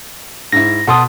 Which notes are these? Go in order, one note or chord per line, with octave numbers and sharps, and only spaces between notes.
G#2 E4 A#6
B2 A4 F#5 A5 C6 D#6